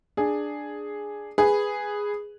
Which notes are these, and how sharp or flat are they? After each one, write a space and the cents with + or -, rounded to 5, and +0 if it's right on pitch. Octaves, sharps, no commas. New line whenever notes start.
D4 +10 G#4 +0
G#4 -5 B4 +0